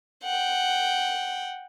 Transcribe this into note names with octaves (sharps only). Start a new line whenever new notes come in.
F#5 G5